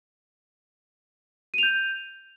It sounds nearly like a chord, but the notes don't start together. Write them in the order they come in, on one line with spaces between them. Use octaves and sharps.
D#7 F7 G6